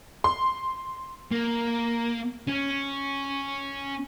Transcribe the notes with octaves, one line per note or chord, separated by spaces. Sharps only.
C6
A#3
C#4